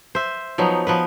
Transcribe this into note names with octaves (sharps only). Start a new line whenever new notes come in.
C5 E5
F3 F#3 B3 D#4
F3 B3 B4